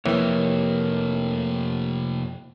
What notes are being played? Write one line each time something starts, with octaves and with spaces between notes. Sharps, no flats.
F2 C3 E3 A#3 A#4 C#5